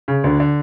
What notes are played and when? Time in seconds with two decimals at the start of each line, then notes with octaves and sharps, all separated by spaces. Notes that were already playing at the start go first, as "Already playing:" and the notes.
0.08 C#3
0.24 D2 D3
0.40 D3